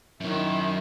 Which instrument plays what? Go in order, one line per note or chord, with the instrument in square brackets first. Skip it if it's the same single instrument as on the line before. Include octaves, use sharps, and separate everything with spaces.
[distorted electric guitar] F#2 [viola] D#3 E4